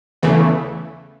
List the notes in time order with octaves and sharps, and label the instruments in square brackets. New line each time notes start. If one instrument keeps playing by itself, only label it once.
[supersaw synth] E2 C#3 E3 A3